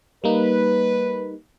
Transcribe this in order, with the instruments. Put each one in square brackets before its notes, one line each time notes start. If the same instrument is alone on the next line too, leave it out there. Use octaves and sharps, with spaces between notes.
[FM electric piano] G3 A#3 D#4 [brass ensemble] B4